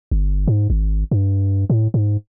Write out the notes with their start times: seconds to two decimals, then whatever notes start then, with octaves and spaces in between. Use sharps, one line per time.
0.11 G1
0.47 G#2
0.70 G#1
1.11 G2
1.70 A2
1.94 G#2